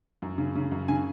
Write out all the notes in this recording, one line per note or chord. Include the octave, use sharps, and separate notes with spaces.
F#2
C#3
C#3
F#2
C#3 G#5